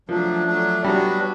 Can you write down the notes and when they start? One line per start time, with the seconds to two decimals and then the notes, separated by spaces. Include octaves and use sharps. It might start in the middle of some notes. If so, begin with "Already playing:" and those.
0.09 F3 F#3 A3 D4
0.47 F#3 A3 D4
0.84 F#3 G3 B3 D4 F#4